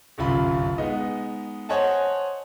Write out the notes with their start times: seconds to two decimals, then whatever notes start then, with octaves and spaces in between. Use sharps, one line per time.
0.18 G1 C2 F#2 F4 B5
0.78 G#3 B3 D#4 D#5
1.69 C5 C#5 D#5 F#5 G#5 A5